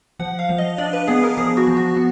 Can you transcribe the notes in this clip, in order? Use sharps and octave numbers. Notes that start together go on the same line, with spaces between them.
F3 F#5
F5
F3
D#5
D4 D5
B4
B3 G#4
A#4
F3 G#4
F#4
F3
F#4
B3